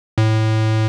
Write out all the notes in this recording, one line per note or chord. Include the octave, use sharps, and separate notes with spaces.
A2